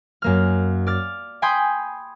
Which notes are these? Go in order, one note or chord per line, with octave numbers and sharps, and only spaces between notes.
F#2 A#3 F6
D5 F6 A6
G5 G#5 B5 C6 D#6 G6